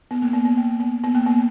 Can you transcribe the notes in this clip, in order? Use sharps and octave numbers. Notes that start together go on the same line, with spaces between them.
B3
A#3
B3
B3
A#3
B3
B3
A#3
B3